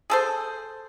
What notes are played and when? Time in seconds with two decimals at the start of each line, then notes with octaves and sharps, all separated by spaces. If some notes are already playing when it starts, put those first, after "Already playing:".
0.10 G#4 A4 C5